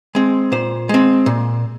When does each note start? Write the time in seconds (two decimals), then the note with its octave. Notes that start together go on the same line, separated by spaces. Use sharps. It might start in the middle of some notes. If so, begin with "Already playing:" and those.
0.15 G#3 C4
0.52 A#2 C5
0.89 G#3 C4
1.26 A#2